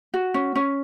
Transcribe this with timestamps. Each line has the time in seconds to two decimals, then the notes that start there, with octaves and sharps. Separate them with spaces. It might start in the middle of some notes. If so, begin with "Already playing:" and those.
0.14 F#4
0.34 C#4
0.55 C#4